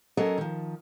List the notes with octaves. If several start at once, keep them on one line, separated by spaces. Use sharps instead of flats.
F#3 C#4 A4 A#4 D#5
D#3 F3